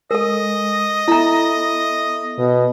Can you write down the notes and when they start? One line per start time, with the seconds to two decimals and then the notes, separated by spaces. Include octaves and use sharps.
0.11 G#3 A4 A#4 D#5
1.08 B3 E4 A4 E5 A#5
2.39 B2